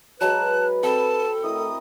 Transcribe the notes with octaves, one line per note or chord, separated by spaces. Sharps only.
F#3 G#3 B4 G#5 A5 F#6
C4 A4 G5 A5 B5
A2 E4 A#4 D#5 D#6